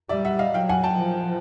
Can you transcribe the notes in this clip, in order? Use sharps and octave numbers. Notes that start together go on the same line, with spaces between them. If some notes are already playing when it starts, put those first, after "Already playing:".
G3 D5 E5
E5 F#5
D#5 F5
F#3 F5 G5
F#5 G#5
G5 A5
F3